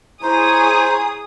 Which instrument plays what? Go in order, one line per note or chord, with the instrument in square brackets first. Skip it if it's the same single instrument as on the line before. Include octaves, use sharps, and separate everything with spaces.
[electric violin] E4 C#5 [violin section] G#4 D#6 [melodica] C5 [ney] A#5